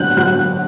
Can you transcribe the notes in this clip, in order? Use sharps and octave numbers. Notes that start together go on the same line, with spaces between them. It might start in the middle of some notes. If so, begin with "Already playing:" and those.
Already playing: F#3 F#6 G6
F#3 F#6